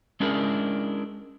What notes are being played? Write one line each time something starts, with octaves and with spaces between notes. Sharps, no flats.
G#3 C#4 D4 E4 G#4 A#4